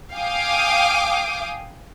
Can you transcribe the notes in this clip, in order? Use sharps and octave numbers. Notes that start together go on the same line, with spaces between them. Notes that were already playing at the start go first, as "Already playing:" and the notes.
F5 G5 G#5 D6 D#6